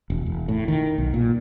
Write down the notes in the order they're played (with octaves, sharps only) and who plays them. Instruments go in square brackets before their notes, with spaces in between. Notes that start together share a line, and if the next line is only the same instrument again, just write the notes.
[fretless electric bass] E1
E1
A2
D#3
B1
A#2